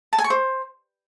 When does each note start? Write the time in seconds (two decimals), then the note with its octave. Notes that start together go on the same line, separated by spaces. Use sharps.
0.13 A5
0.18 G#5
0.24 C#6
0.30 C5